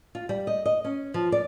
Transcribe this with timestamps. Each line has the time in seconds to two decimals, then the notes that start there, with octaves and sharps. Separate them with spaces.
0.15 F4
0.29 G3
0.47 D#5
0.66 D#5
0.84 C#4
1.14 F3
1.32 D5